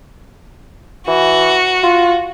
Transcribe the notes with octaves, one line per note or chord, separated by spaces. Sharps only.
E3 F#4
F4